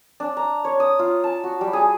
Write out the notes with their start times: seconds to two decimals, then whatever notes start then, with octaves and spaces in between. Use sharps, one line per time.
0.20 D4
0.37 A#5
0.65 C#5
0.80 D#6
0.99 F4
1.24 A5
1.44 F#4
1.61 G3
1.73 G#4